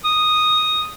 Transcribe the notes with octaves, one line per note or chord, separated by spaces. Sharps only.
D#6